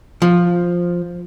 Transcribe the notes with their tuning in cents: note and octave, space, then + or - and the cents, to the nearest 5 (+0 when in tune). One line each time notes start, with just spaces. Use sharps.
F3 +5